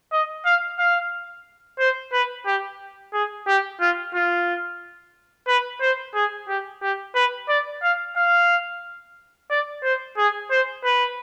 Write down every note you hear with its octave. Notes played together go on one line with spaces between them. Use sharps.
D#5
F5
F5
C5
B4
G4
G#4
G4
F4
F4
B4
C5
G#4
G4
G4
B4
D5
F5
F5
D5
C5
G#4
C5
B4